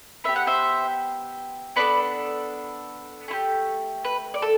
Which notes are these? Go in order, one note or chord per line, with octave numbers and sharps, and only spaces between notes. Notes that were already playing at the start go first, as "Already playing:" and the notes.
B3 D4 G4 E5
F#5
C5 E5
B3 D4 A4 B4 D5
A3 E4 G4
B4
D5
A4